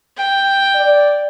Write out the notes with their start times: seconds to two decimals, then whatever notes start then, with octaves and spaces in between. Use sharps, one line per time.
0.17 G5
0.75 D5